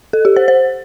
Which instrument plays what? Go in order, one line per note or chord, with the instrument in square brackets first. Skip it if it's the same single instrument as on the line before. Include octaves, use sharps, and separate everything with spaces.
[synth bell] A4
G4
C5
C5